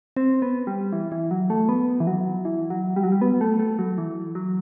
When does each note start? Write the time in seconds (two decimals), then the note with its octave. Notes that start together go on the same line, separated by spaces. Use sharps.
0.17 C4
0.42 B3
0.67 G3
0.93 E3
1.12 E3
1.31 F#3
1.50 A3
1.69 B3
2.00 E3
2.07 F#3
2.45 E3
2.70 F#3
2.96 G3
3.03 F#3
3.12 G3
3.21 B3
3.41 A3
3.59 A3
3.79 F#3
3.98 E3
4.35 F#3